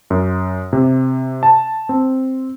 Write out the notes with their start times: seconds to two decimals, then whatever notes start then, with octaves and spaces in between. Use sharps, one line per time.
0.10 F#2
0.73 C3
1.43 A5
1.89 C4